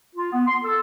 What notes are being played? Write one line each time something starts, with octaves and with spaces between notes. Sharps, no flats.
F4
B3
C6
A4